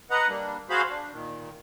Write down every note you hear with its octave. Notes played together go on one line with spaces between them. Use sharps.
B4 D#5 F#5 A#5
G3 A#3 D4
F#4 G#4 C5 F5 B5
D4
A#2 D#3